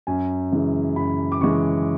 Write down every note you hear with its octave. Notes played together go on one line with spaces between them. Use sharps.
F#2 G#5
C#3 E3 G#3
F#2 B5
D6
C#3 E3 G#3 C#6